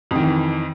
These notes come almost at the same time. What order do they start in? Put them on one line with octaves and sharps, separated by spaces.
F2 D#3 E3